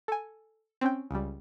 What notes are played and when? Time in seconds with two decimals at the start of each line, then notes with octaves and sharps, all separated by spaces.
0.08 A4 G#5
0.81 C4 C#4 G5
1.11 C#2 G3